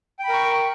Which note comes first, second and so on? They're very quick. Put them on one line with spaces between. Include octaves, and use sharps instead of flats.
G5 B5 A#4 C#6